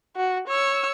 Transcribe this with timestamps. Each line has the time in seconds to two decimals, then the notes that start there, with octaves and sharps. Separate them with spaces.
0.16 F#4
0.48 C#5 E6